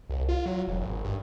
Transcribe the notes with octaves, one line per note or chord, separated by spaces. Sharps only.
C2
F4
F#3
E1
G#1
G2